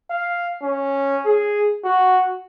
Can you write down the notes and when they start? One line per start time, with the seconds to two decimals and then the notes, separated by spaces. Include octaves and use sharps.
0.11 F5
0.63 C#4
1.26 G#4
1.84 F#4